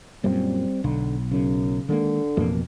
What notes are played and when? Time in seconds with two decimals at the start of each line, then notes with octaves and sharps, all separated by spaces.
0.24 F#2 A#2 G3 A#3 C4
0.84 B1 D3
1.32 F#2 C#3
1.89 D3 D#3 G#3 A#3
2.37 A1 F2 B2 A#3